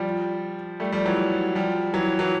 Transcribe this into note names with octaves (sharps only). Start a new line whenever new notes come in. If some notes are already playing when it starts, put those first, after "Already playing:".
Already playing: F3 G3
G3 A3
F3 G3
E3 F#3
F3 G3
E3 F#3
E3 F#3